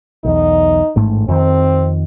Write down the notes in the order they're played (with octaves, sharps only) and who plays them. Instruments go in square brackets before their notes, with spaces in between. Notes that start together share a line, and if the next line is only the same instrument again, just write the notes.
[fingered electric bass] B1 E2 [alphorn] D#4
[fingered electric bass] A1 G#2 A3
[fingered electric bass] F2 D#3 [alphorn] C4